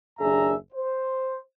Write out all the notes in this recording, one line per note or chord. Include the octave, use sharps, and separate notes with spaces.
F#1 D#2 D4 G#4 E5 A#5
C5